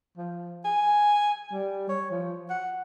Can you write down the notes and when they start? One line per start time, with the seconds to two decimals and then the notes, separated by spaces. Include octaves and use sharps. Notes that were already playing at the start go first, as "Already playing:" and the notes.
0.18 F3
0.65 G#5
1.53 G3
1.89 C#5
2.11 F3
2.50 F#5